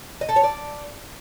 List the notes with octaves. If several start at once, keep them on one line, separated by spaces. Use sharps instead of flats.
D#5
A4
C#5
D5